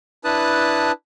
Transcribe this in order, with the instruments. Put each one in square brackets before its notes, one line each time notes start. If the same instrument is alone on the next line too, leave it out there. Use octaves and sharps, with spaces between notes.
[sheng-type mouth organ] D4 E4 B4 A5 D#6 F#6